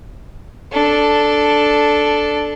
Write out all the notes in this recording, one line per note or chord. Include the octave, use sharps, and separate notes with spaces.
D4 A4